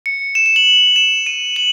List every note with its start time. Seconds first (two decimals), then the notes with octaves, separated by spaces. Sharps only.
0.06 C#7
0.35 E7
0.46 E7
0.56 F#7
0.96 E7
1.26 D#7
1.56 F#7